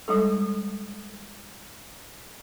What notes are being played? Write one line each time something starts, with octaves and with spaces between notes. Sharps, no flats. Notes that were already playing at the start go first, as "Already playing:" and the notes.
G3 G#3 A4